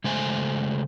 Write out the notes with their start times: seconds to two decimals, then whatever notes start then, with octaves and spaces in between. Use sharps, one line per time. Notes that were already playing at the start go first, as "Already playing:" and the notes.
0.04 C#3 G#3 A3 C5 G#5